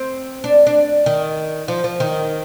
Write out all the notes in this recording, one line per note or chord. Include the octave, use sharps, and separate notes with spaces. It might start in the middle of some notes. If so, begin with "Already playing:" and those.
Already playing: C4
D4
D4
D#3
F3
F3
D#3